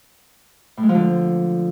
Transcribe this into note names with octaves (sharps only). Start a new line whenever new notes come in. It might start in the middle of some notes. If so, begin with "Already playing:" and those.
A2
G#3
F3
D3